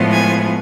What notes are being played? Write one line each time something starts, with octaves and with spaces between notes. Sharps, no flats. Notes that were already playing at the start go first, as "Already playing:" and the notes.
Already playing: A2 F3 G#3 B3
G#5